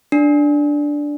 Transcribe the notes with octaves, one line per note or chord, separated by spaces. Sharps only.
D4